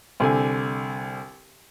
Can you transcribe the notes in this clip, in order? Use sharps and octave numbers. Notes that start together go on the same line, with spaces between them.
C2 D3 G#5